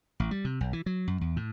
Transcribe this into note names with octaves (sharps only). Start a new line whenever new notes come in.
A1
G3
C3
B1
E3
F#3
F#2
E2
A2